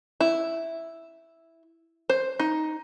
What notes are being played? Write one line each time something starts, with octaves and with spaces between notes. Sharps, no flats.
E4
C5
D#4